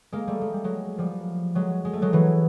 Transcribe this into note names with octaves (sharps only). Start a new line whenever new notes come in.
G#3 A#3
G3 A3
G#3
G3
F#3 G#3
F3 G3
F#3 G#3
G#3
A3
F#3 G#3
E3 F#3